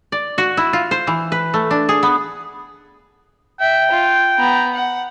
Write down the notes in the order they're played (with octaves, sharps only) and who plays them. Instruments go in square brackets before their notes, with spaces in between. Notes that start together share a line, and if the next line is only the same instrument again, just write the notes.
[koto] D5
F#4
E4
F4
C5
E3
B4
A3
D4
G#4
B3
[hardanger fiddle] E5 [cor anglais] G5
[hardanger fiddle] F4
B3 A#5
F#5